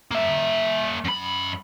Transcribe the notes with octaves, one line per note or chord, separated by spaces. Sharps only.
A#3 E5
F#2 B5